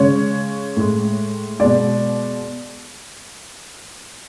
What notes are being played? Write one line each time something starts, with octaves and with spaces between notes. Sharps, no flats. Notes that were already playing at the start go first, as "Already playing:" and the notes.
Already playing: C#3 G#3 C#5
A2 G#3
B2 G#3 D5